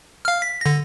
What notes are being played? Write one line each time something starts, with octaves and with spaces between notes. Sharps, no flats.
F5 F6
B6
D3 A#6